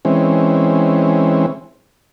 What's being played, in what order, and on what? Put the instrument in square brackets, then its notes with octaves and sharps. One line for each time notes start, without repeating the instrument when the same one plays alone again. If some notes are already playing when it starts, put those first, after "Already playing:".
[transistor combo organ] E3 G#3 C4 C#4